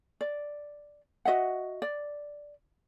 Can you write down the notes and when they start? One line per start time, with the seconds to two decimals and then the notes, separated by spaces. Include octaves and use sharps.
0.21 D5
1.25 F#4 D#5 E5 F#5
1.82 D5